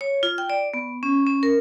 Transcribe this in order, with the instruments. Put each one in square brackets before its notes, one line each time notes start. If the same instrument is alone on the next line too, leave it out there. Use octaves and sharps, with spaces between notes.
[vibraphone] C#5
F4
G5
D5
B3
C#4
C#4
A#4